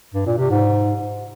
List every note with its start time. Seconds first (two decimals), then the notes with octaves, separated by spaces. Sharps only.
0.14 G2
0.26 A#2
0.38 C3
0.50 G#2